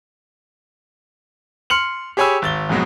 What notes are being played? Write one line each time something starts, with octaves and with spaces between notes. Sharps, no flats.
C6 F6 C#7 F#7
G4 G#4 C#5 G#5 B5 E6
G#1 A6 G7
F2 G#2 B2 F#3 G#3